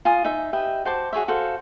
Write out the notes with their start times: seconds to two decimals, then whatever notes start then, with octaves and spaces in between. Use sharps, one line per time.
0.05 F4 G#5 D#6
0.25 D#4 E5
0.53 G4 B4 D#5 E5
0.85 F#4 C5 A5 D6
1.13 F#4 G#4 C#5 E5
1.28 F#4 A4 C5 F5